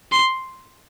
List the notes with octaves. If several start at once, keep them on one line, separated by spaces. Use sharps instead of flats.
C6